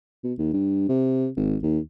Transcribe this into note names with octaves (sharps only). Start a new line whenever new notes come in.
B2
D#2
G2
C3
G#1
D#2